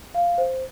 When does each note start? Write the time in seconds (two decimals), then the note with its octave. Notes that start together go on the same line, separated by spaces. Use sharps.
0.14 F5
0.38 C5